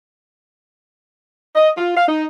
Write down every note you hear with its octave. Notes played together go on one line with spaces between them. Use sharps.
D#5
F4
F5
D#4